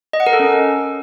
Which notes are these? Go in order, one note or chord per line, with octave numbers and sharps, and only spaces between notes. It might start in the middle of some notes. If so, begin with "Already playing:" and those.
D#5
F#5
A#4
A4
C#4